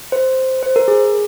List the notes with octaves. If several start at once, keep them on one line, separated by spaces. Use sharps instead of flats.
C5
C5
A#4
G#4